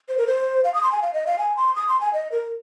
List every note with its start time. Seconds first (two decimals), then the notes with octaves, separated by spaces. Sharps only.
0.09 C5
0.18 A#4
0.27 C5
0.64 F5
0.74 D#6
0.83 C6
0.92 G#5
1.02 F5
1.14 D#5
1.27 F5
1.38 G#5
1.57 C6
1.76 D#6
1.89 C6
2.01 G#5
2.13 D#5
2.32 A#4